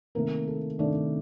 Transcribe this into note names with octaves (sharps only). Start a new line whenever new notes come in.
C3 D#3 A3 A#3 A#4
A4
C3 D#3 A3 D4 D5